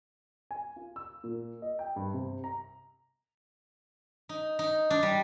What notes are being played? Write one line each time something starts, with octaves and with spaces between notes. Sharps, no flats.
G#5
F4
E6
A#2
D#5
G5
G2
C3
A#5
D#4
D#4
D4
G3